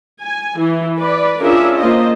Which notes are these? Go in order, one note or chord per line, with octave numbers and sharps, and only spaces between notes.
G#5
E3
B4 D5
C#4 D4 F4 G#4 A#4 E5
A#3 F4 C5 D#5